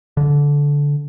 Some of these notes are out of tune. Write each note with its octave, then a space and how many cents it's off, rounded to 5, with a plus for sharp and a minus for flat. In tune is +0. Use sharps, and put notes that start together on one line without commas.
D3 -20